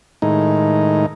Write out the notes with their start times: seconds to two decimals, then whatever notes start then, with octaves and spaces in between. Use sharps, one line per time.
0.22 A2 D#3 G#3 D#4